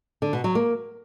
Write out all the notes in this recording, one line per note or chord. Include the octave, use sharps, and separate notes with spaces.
D3
B2
F#3
A#3